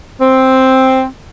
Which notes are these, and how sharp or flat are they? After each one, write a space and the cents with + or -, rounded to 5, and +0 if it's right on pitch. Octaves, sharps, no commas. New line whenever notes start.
C4 +5